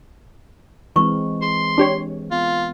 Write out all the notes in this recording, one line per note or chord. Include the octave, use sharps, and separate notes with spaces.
E3 G#3 C4 E4 B4 C#6
G#4 C6
D4 G4 C#5
B3 F4